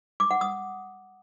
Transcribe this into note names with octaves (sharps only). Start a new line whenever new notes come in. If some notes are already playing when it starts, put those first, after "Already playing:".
D6
F#5
D#6